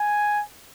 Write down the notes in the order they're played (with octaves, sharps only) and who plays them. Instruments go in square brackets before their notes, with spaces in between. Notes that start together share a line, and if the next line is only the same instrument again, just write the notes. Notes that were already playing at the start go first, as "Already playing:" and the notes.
Already playing: [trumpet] G#5